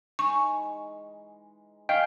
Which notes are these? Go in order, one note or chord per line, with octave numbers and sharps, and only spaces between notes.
E3 G#3 D#4 C#6
G#4 D#5 F5 G5